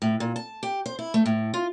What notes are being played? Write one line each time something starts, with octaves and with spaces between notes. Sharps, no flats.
A2
A#2
A5
G4
C5
E4
A3
A2
F4